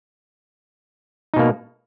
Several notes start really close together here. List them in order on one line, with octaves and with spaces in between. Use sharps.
D#4 B2 A#3